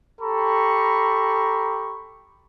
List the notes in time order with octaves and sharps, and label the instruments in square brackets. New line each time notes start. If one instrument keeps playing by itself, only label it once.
[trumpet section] G4 A4 A#5 B5 C#6